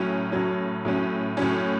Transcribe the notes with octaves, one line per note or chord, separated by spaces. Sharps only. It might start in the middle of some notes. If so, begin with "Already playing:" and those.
Already playing: A2 F#3 C#4
A2 F#3 C#4
A2 F#3 C#4
A2 F#3 C#4